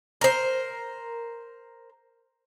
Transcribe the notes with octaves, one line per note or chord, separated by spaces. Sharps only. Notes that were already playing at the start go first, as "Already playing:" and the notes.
A#4 C5